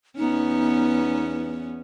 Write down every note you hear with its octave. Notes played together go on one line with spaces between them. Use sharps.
E2 B3 C#4 D#4